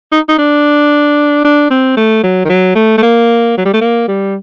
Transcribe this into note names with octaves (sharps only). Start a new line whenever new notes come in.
D#4
D#4
D4
D4
C4
A3
F#3
D#3
F#3
A3
A3
A#3
F#3
G3
A3
A#3
G3